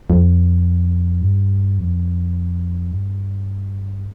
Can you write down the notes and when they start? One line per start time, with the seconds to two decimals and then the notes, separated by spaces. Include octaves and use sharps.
0.10 F2
1.22 G2
1.79 F2
2.91 G2